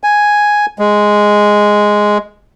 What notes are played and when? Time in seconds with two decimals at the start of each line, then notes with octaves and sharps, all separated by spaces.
0.03 G#5
0.79 G#3